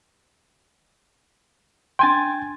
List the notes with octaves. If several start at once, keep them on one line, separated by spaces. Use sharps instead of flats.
D4 G5 G#5 C6 A6